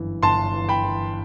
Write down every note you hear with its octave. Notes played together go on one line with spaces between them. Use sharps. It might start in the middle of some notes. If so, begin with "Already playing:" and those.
Already playing: G1 F#2 E3
G1 A5 C6
E3
G5 B5
E3